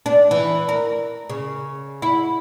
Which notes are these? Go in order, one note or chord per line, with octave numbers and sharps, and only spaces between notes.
D4
E3
A#4
C#3
E4